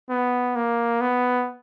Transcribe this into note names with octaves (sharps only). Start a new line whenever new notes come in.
B3
A#3
B3